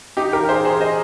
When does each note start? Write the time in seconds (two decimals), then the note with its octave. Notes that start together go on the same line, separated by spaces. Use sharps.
0.17 D#4 G4
0.32 G4 A#4
0.49 G#4 C5
0.64 G#4 C5
0.80 C5 D#5